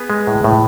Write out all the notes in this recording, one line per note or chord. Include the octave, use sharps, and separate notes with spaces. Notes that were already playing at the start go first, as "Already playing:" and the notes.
Already playing: B3 G#4 B4
G#3
A2
A2